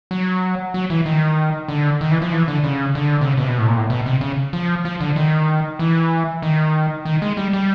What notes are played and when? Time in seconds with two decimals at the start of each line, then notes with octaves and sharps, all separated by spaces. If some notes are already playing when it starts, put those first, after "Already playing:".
0.11 F#3
0.74 F#3
0.90 E3
1.06 D#3
1.68 D3
2.01 D#3
2.11 E3
2.22 F3
2.32 E3
2.48 D3
2.64 C#3
2.95 D3
3.21 C3
3.26 C#3
3.37 B2
3.43 C3
3.48 B2
3.58 A2
3.68 A#2
3.77 A2
3.90 B2
4.06 C3
4.21 C#3
4.53 F3
4.85 F3
5.01 D3
5.16 D#3
5.79 E3
6.42 D#3
7.05 D#3
7.22 G#3
7.37 G3
7.53 G3